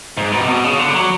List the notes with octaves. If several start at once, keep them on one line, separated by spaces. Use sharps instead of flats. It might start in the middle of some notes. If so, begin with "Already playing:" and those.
G#2
B2
C3
B2
C#3
D3
G3
F#3